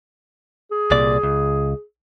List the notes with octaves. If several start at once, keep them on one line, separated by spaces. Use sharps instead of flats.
G#4
C2 A#2 D5
C#2